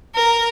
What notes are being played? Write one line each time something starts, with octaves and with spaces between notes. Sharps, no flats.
A#4